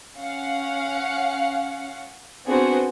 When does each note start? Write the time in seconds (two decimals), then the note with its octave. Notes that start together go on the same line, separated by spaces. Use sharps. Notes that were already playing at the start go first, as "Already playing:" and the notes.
0.18 C#4 F5 F#5
2.46 B3 C4 D4 F#4 G#4 C5